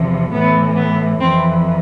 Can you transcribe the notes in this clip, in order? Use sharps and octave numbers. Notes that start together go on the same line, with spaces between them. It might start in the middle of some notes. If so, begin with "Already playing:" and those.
Already playing: E2 C3 F3
A2 E3 B3
B3
F2 E3 C4